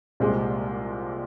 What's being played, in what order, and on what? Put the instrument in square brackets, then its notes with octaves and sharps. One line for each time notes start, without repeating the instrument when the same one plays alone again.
[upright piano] C2 A#2 G#3 C4 G4